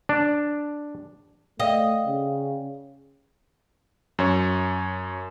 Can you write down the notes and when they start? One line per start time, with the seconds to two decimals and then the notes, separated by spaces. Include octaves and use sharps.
0.09 D4
1.60 A3 D5 D#5 F5 G5
2.06 C#3
4.19 F#2 C#5